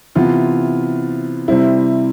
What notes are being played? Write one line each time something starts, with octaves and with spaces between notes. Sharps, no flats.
C3 E3 B3 F4
C3 G3 C4 E4